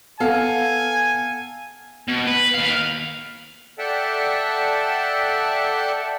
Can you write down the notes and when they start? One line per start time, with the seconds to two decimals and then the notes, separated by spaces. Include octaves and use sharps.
0.20 B3 A4 F5 G#5
2.08 B2
2.27 B4
2.55 D#2 F5
3.79 A4 D5 E5 F#5 G5 A5